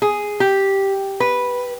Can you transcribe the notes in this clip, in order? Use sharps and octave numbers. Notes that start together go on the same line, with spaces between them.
G#4
G4
B4